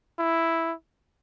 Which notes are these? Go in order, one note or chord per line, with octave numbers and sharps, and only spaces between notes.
E4